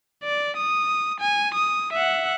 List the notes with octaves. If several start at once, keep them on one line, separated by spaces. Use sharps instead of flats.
D5
D#6
G#5
D#6
E5 F#5